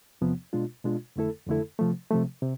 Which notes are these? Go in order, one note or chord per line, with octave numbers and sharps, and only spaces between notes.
E2 C3 F3 B3
B2 G#3 D4 F4
B2 G#3 D4 F4
F2 D3 A3 E4 A4
F2 D3 A3 E4 A4
C3 F3 A3
C3 F3 A3
C3